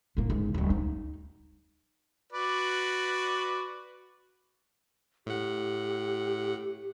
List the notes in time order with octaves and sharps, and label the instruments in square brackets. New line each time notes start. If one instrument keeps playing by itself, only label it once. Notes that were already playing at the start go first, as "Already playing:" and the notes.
[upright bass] A2 A#3
G#2
D1 G3
D#4
[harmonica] F#4 B4 D5
[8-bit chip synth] A2 F#5 [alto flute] G4